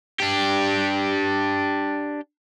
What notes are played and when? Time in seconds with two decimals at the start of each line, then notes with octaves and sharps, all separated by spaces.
0.20 D4 G4